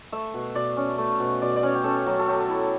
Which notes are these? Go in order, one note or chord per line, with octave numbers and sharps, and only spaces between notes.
A3 E5
B2
B2 D5
C#4
A3
B2
B2 D5
D5
C#4 C#5
G4
C#4 A4
F#3
A4
F#3 G4
E4